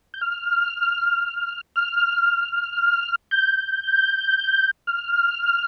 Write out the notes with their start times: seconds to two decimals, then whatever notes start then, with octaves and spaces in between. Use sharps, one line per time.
0.14 G6
0.21 F6
1.76 F6
3.31 G6
4.87 F6